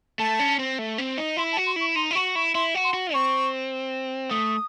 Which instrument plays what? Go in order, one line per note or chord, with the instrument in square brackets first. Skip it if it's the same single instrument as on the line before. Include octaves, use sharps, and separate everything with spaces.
[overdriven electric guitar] A3 [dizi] A5
[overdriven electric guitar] C#4
C4
A3
C4
D#4
[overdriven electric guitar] E4 [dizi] C6
[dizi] A5
[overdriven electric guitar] F#4
[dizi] C6
[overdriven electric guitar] E4 [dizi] C#6
[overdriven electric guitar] D#4 [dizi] C6
[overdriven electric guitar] E4
[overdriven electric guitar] F#4 [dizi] C#6
[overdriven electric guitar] E4 [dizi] C#6
[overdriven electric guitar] E4 [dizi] C6
[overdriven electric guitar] F#4
[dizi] C6
[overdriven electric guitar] F#4
[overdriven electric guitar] C4 [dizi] C#6
[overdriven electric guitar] A3 [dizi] D#6